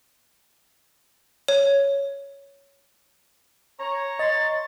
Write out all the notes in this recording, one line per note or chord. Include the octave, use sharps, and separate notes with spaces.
C#5
C#5 A#5
D#5 C6 A6